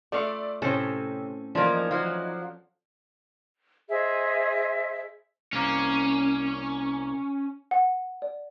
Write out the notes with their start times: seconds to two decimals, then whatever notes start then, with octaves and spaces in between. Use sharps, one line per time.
0.12 A3 F4 D5 E5 F5 C#7
0.62 A2 C3 C4 C#4 A4 C5 C#5 G#5
1.55 E3 F3 A#3 D4 D#4
1.91 F3 F#3
3.89 G#4 C5 D#5 E5
5.53 C2 A#3 C#4
7.71 F#5
8.22 D5